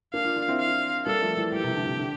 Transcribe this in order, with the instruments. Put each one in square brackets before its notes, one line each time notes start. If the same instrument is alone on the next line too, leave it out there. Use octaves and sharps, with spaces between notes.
[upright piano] A#3 D4 [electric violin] F5
[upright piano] D4 F4
D4 F4
C4 E4
[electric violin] F5
[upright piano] G3 A#3 [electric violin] A4
[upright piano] F3 A3
E3 G3
[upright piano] E3 G3 [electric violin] G4
[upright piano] C3 E3
D3
C3
D3